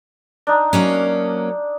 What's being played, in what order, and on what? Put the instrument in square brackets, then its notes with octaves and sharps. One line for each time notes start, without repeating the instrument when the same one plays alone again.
[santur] D4 D#4
[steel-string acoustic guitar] F#3 A#3 C#4